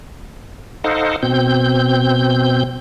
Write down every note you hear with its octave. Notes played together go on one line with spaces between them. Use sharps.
D#4 A4 C5 D#5 F5 F#5
B2 C4 G6